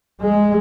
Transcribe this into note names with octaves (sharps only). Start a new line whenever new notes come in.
G#3